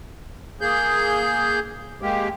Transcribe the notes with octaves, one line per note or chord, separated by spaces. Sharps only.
A#3 G#4 G6
G#3 A#3 G4